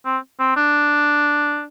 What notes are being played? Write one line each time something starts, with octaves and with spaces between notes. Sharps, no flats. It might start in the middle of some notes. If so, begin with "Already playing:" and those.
C4
C4
D4